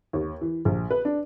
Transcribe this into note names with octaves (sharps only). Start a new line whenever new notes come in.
D#2
E3
A#1
B4
D4